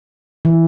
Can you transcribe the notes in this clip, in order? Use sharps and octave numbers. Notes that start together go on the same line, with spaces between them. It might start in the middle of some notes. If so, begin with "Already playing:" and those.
E3